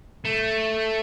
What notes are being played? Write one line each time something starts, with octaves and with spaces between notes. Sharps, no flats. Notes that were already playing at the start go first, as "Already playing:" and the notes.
A3